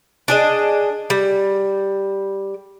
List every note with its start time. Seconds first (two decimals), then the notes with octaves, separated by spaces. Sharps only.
0.28 D4 G#4 D#5
1.10 G3